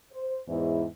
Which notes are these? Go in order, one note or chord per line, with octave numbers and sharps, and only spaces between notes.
C5
E2 G#2 E4